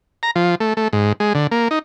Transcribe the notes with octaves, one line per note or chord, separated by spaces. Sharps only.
A#5
F3
A3
A3
G#2
G#3
D3
A#3
D#4